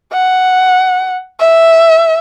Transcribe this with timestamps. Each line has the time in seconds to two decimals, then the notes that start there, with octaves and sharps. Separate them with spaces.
0.13 F#5
1.40 E5